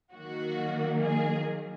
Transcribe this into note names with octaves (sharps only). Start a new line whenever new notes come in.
D#3 F#3 A#3 F#4
G#4